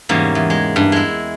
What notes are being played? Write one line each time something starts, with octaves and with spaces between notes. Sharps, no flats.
E2 G#2 C#3 G3 A#3
E2
G#3
G2
G#3 E4